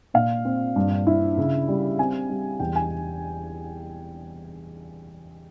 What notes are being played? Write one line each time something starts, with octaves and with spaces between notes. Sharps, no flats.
A#2 F5
C4
G2
E4
C#3
G3
C4 G#5
G3
E2 G5
G#5